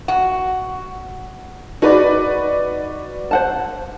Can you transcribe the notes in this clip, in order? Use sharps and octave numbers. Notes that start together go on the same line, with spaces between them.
F#4
D#4 F#4 B4 D5
C5 F#5 A5